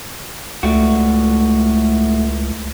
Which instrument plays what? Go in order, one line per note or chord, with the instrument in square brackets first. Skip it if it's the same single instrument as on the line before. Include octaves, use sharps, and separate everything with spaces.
[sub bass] C#2 [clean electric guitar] A2 A3 F#4